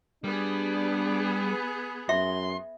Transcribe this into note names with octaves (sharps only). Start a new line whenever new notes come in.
G3 B3 D4 G#4
F#2 E5 C6